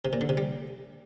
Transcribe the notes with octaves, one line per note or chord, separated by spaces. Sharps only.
C3
A#2
D3
C3
G3